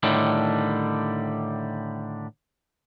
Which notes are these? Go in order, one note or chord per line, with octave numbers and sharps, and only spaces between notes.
A2 D3 D#3 G3